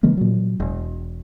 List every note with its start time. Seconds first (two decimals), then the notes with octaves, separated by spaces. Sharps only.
0.03 C#3 E3 G#3 A#3
0.17 A#2 F#3
0.60 E1